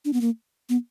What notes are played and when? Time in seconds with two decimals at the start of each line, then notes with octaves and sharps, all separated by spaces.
0.05 D4
0.13 B3
0.21 A#3
0.69 B3